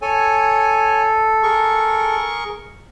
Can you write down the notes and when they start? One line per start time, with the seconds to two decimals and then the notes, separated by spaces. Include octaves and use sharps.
0.02 A4 C#5 G#5
1.43 G#4 A#4 C#6